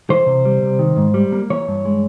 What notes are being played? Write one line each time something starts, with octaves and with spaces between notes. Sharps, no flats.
E3 C5
C3
G3
C3
D#3
G#2
G3
A#3
E3 C#5
G2
G#3